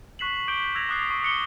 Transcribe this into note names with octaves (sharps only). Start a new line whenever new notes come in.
C#6 F#6 B6 C7 E7 F#7
C#6 D6 G6 D7 G7
E6 F#6 G#6 A#6 F7
D6 D#6 F#6 A6 C7
C#6
D#6 F#6 C#7 D7 G7